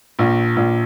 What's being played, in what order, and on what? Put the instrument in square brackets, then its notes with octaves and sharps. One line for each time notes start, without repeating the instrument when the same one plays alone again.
[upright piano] A#1
A#1